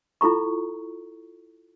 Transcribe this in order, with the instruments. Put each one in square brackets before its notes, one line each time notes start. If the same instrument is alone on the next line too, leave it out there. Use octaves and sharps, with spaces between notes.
[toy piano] E4 F4 A4 A#5 C#6